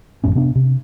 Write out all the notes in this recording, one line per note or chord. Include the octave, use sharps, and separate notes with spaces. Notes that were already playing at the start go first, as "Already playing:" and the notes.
G#1 F2 A2 C#4
C3 B3 D4
C3